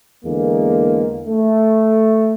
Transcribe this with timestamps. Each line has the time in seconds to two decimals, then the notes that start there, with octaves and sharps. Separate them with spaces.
0.23 E2 D3 G#3 A#3
1.27 A3